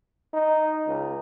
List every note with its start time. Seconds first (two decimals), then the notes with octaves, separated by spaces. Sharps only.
0.33 D#4
0.87 C#2